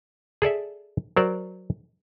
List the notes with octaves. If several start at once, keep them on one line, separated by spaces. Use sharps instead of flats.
G#4 A4 D5 E5
F#3 A#4 C5 D5